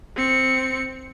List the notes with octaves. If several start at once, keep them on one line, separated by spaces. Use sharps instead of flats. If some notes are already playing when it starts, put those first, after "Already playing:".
C4 C#7